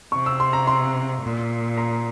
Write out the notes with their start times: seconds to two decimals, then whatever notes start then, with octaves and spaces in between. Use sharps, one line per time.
0.12 C3 C#6
0.26 E6
0.40 C6
0.53 A#5
0.67 C6
1.22 A#2
1.77 A#5